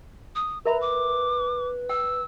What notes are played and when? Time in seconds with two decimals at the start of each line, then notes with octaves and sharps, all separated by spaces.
0.35 D#6
0.66 A#4 B4 E5 A#5 B5
0.81 D6
1.89 G5 E6